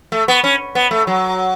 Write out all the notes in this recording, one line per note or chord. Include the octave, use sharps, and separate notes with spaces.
A3
B3
C#4
B3
A3
F#3